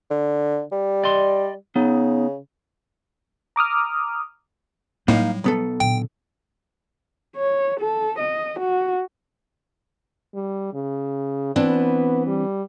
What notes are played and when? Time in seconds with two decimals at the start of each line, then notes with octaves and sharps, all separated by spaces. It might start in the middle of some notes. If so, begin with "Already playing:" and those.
0.10 D3
0.72 G3
1.04 D5 D#5 C6
1.76 C#3 B3 D#4
3.56 A#5 D6 D#6 F6
5.08 A2 F#3 G3 A#3 D#4 F5
5.44 B1 B3 A4
5.80 A#2 D3 G5
7.36 C#5
7.80 A4
8.19 D#5
8.59 F#4
10.34 G3
10.74 C#3
11.56 E3 B3 C4 D4
12.27 G3